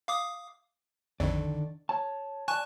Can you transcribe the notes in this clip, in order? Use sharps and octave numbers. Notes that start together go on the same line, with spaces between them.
F5 D6 D#6
A#1 F2 D3 D#3 D5
C#5 A5
D5 G#5 A5 C#6 F#6